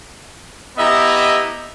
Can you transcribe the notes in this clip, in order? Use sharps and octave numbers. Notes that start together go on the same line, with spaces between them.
B3 E4 G4 D#5 E5 A#5